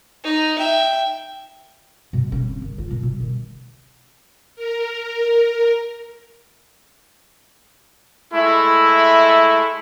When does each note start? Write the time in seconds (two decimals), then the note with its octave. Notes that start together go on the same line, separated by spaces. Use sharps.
0.24 D#4
0.58 E5 G5
2.13 B2
2.32 C#4
2.48 C4
2.62 D#3
2.78 F4
2.90 A#2
3.03 B2
3.20 D#3
4.56 A#4
8.33 G#3 A3 E4